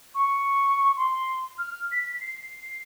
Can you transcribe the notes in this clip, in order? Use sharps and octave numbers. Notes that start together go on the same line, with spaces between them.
C#6
C6
F6
B6
C7